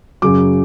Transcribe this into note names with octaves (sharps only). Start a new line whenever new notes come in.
F#2 C#3 F#3 D6